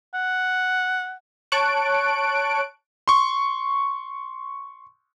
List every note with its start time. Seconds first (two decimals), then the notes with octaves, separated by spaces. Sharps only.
0.14 F#5
1.52 C#5 A5 C#6 F#6 D7
3.08 C6 C#6